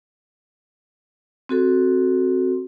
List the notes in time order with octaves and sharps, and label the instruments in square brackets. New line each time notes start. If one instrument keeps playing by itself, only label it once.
[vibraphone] C4 F#4 A4